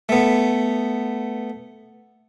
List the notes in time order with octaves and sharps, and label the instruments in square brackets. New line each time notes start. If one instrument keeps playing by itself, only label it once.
[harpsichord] A3 B3